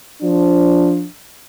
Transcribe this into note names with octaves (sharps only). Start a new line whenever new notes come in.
F3 D4